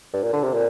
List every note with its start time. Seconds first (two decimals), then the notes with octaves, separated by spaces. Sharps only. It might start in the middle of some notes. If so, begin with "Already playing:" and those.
0.13 G2
0.23 A#2
0.33 D3
0.43 C3
0.53 A#2